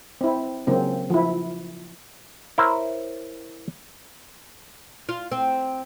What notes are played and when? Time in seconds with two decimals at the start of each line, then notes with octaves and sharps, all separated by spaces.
0.21 C4 E4
0.67 C#3 F#3 A#3 C4
1.10 F3 E4
2.58 E4 A#4 C5 C#5
5.09 F4
5.32 C4